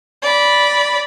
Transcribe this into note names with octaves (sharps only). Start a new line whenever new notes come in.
D5 B5